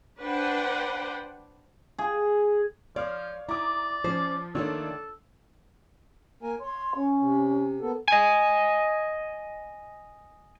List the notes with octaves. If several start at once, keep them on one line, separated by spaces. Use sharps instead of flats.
D4 B4 C5 F#5 G5
G#4
F3 C#5 D5 F5 F6
E4 D5 A#5 D6 D#6
F3 C#4 C5
D#3 A3 A#3 D4 F4 A4 C#5
A#3 A#4 G#5
C#5 C6
C#4
C3
A#3 B3 A4
D#5 G#5